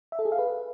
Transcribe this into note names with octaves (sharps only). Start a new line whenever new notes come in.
E5
A4
G#4
F5
B4